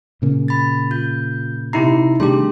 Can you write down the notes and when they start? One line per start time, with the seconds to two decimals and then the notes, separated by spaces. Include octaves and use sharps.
0.22 A#2 C#3 A#3
0.48 B5 A6
0.91 F4 G6
1.73 C3 D#4 E4 A#5 C7
2.20 C3 D#3 G3 A3 D4 G4 G#4 C6